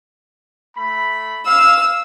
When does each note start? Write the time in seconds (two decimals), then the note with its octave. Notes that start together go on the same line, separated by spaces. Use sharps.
0.76 A3 B5
1.47 F5 E6